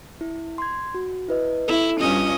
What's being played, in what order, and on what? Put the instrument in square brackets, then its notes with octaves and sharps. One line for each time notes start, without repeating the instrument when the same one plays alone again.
[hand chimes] E4
C6 G#6
F#4
E4 B4 D#5
[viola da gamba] E4 [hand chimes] A4
[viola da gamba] G2 C#4 D#5 [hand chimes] F4